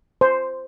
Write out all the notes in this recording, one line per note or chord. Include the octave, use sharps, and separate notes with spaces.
C5